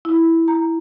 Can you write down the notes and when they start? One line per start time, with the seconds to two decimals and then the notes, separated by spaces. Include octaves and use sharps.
0.05 E4
0.48 A#5